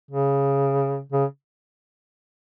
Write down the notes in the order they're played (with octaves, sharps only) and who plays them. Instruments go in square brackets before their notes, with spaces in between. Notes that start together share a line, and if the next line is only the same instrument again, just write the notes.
[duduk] C#3
C#3